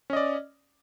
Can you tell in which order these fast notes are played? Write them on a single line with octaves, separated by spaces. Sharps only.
C#4 D#5 D5